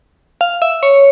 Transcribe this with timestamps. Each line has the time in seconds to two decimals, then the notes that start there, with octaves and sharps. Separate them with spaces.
0.41 F5
0.62 E5
0.83 C#5